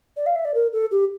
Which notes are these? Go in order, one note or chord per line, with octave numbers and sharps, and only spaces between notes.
D5
F5
E5
D5
A#4
A4
G4